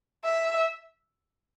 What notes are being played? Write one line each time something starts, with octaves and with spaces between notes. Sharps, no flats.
E5